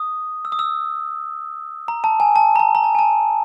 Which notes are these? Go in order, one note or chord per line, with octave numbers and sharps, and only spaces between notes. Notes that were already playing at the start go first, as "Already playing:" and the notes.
Already playing: D#6
E6
D#6
E6
A#5
A5
G#5
A5
A#5
A5
A#5
A5
G#5
A5